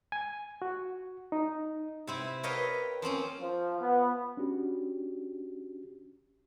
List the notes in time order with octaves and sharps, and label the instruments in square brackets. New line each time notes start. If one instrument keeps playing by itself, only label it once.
[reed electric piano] G#5
F#4
D#4
[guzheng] C3 C4 E4
A#4 B4 C#5 D#5 F5 G5
F3 A#3 C4 C#4
[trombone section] F3
B3
[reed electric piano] C#4 D4 F#4 G4